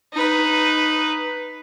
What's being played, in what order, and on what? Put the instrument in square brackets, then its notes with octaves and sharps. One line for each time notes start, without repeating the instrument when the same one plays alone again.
[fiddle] D#4 B4